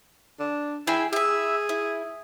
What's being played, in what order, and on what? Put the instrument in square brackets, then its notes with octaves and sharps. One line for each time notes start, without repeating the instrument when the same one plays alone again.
[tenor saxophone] D4
[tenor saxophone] E4 [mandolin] G#4 G5
[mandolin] E4 E5 [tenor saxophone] G#4
[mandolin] E4